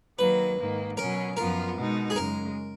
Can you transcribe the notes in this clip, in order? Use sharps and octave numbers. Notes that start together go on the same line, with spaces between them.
D#3 F#3 A#3 B4
G#2 D#3 A#3
B2 F#3 C#4 A#4
F#2 F3 B3 F4 A#4
B2 G#3 D#4
G#4
F#2 C#3 G#3 A#4